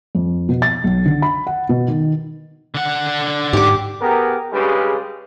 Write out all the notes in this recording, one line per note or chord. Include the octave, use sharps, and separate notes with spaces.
F2
B2
A6
B1
D3
B5
F#5
B2
D#3
D3 F#5
G#2 G4 D6
B3 G4 G#4 A#4
G2 C#3 G3 G#3 G4 B4